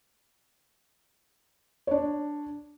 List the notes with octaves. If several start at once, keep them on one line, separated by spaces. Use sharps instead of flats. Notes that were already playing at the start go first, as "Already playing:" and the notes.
D4 C#5